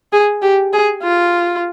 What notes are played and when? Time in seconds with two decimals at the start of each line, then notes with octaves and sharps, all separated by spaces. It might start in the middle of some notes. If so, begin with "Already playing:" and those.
0.13 G#4
0.42 G4
0.73 G#4
1.03 F4